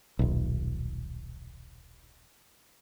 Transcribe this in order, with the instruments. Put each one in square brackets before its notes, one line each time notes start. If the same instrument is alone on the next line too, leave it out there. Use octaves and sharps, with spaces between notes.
[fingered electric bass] D#1 B1